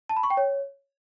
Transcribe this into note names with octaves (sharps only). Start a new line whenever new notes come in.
A5
B5
C#6
G5
C#5